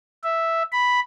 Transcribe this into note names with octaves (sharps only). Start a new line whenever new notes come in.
E5
B5